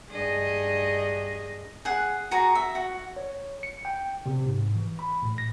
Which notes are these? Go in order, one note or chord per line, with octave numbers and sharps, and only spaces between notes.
G2 G#4 D#5
G#4 F#5
F#4 G#4 A#5
E5
F#4
C#5
C#7
G5
C3
G#2
E3
B5
A2
A#6